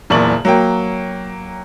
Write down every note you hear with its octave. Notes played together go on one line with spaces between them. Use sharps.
F#1 E2 A#2 D5 C#6 F#7
F#3 A#3 G5